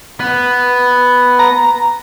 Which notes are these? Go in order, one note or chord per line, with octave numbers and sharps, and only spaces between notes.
B3
A#5